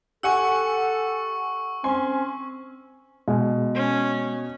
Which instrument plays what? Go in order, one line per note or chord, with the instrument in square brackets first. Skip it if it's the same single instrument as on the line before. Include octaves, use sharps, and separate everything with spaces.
[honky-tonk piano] G4 F#5 G#5 [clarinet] A4 [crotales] C#6 E6
[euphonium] C4 [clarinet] C#4 [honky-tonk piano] G#5 C6
[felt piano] B2 [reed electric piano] G#3
[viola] C#4